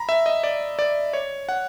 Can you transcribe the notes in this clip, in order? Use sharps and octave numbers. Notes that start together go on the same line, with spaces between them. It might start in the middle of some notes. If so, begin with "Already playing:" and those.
Already playing: A#5 B5
E5
D#5
D5
D5
C#5
F#5